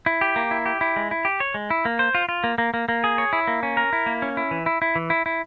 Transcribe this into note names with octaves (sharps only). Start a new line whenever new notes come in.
E4
G4
A#3
E4
G4
E4
G#3
E4
G4
C#5
G#3
E4
A#3
C5
F4
F4
A#3
A#3
A#3
A#3
G#4
C#5
E4
A#3
C#4
A#4
E4
A#3
C#4
E4
E3
E4
E4
E3
E4
E4